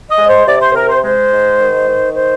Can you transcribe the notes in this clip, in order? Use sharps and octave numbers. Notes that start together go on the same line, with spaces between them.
D#5
G#3
C5
C3 D5
C5
C3 A#4
C5
G#3 C5
G#2
D#3
D#3
C5